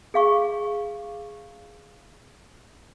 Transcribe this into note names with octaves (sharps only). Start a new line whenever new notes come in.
G#4 F5 C#6